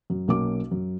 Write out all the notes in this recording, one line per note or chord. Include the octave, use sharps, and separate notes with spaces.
F#2
B1 A#3 C#4 D6
F#2